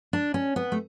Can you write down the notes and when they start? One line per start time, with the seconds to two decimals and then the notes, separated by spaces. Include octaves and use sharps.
0.13 D4
0.34 C#4
0.56 B3
0.72 A3